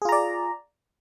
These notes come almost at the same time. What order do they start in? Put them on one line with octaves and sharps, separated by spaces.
G#4 F4 A#5 D5